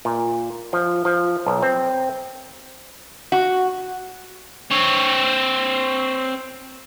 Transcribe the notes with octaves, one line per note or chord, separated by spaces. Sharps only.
A#2
F3
F3
B1
C4
F#4
C4 C#5